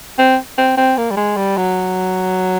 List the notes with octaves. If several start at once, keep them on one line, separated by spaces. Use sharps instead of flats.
C4
C4
C4
A#3
G3
G#3
G3
F#3